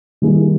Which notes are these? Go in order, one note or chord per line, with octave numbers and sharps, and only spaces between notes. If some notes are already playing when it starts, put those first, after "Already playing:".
D#3 G3 A#3 E4 G#4